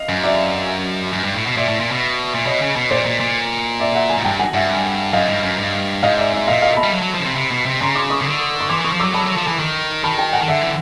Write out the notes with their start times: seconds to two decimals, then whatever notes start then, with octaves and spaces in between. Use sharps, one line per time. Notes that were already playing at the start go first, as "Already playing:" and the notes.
Already playing: D#5 F5
0.09 F#2
0.24 D5 E5
1.13 F#2
1.24 G2
1.35 A2
1.46 B2
1.57 A#2 D5 E5
1.68 A2
1.80 A#2
1.91 B2
2.35 A#2
2.46 B2 C#5 D#5
2.61 C#3
2.76 B2
2.91 A#2 C5 D5
3.06 A#2
3.20 A#2
3.80 D5 E5
3.95 E5 F#5
4.09 G#5 A#5
4.17 G#2
4.24 G2 G5 A5
4.39 F#5 G#5
4.54 G2 E5 F#5
5.13 F#2 D#5 F5
5.29 G2
5.43 F#2
5.58 G2
6.03 G#2 D#5 F5
6.18 D5 E5
6.33 D5 E5
6.47 A#2 D#5 F5
6.62 D#5 F5
6.77 A5 B5
6.83 G3
6.91 F#3
7.02 F#3
7.15 F3
7.20 C#3
7.25 C3
7.36 C3
7.51 B2
7.66 C3
7.81 C#3 A#5 C6
7.96 C6 D6
8.10 C#6 D#6
8.21 C#3
8.25 D3
8.61 C#6
8.70 E3 C6 D6
8.81 E3 C#6 D#6
8.92 F3
9.00 D6 E6
9.03 F#3
9.14 F#3 A5 B5
9.26 F#3
9.37 F3
9.48 E3
9.59 D#3
10.04 D#3 A5 B5
10.18 G5 A5
10.33 F#5 G#5
10.42 D#3
10.48 D3 E5 F#5
10.61 E3